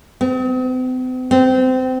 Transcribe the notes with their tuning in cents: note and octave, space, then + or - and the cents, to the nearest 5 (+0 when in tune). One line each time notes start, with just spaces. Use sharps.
C4 -45
C4 -25